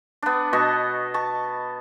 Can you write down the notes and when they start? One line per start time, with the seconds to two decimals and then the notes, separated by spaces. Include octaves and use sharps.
0.22 B3 D4
0.53 B2 D#5 A5 C#6
1.14 A5 C#6